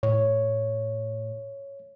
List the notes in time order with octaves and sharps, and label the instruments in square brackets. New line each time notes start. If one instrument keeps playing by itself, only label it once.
[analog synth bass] A2 [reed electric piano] C#5